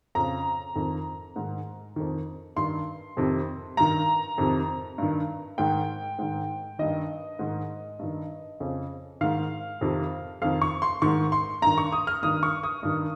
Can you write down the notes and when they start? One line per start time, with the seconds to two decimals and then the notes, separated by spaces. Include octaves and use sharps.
0.15 F2 C#3 A#5
0.76 F2 D#3
1.36 G#2 D#3
1.96 F2 D#3
2.56 G2 D#3 C6
3.17 F2 C3 D#3
3.77 G2 D#3 A#5
4.38 F2 C3 D#3
4.98 G2 D#3
5.58 G#2 D#3 G5
6.19 G#2 D#3
6.79 G2 D#3 D#5
7.39 G#2 D#3
7.99 G2 D#3
8.60 F2 C#3
9.21 G#2 D#3 F5
9.81 F2 C3 D#3
10.42 F2 D#3 F5
10.62 C#6
10.82 C6
11.02 G#2 D#3 C#6
11.32 C6
11.62 G2 D#3 A#5
11.78 C#6
11.92 D#6
12.07 F6
12.23 G2 D#3 D#6
12.43 C#6
12.63 D#6
12.83 G2 D#3